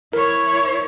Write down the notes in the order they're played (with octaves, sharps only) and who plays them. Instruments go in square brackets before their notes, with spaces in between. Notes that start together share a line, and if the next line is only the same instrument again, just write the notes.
[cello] E4 C#5 [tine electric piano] A#4